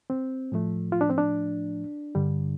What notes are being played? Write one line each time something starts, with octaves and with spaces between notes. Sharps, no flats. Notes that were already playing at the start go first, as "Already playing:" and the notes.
C4
A2 F3 A3
F4
D4
C4
D4
G2 D3 G3